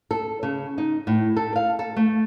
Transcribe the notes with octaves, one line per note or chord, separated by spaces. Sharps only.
A4
C#3
D#4
A2
A4
F5
A4
A3